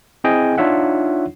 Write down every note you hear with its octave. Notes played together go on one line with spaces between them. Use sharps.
C4 E4 G#4 D#5 G5 G#5
D4 D#4 F4 C#5 E5 F#5